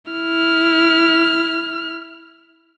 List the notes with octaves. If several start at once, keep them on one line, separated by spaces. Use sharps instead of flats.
E4 F6